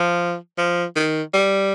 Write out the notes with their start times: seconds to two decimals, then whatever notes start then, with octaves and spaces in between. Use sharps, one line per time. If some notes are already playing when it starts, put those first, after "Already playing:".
Already playing: F3
0.58 F3
0.96 D#3
1.34 G3